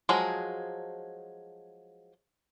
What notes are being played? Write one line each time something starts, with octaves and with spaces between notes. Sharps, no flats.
F3 F#3 G#3 G#4